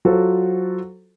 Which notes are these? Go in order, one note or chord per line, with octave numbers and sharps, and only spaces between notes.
F#3 F4 F#4 A4 C5